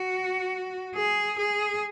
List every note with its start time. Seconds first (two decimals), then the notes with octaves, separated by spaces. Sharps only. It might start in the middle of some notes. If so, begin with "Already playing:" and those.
Already playing: F#4
0.95 G#4
1.39 G#4